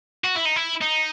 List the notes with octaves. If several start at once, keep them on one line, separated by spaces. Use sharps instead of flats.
F#4
E4
D#4
E4
D#4